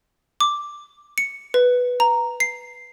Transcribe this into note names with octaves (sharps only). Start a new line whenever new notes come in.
D6
C#7
B4
A#5
C7